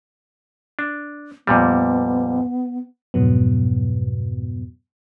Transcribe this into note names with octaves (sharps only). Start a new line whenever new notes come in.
D4
F2 A#2 G3 B3
F2 G#2 B2 F#3 B3